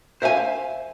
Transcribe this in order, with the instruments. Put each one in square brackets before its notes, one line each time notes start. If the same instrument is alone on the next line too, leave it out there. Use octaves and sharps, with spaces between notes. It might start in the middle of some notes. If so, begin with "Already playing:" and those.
[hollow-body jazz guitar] C5 E5 F5 G#5